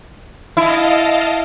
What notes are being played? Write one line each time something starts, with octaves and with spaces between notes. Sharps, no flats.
E4 D#5 F5 A5